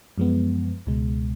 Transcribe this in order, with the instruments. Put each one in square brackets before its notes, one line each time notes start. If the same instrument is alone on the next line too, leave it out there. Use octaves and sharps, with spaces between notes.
[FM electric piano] F#2 F3 G#3 B3
C#2 B2 G#3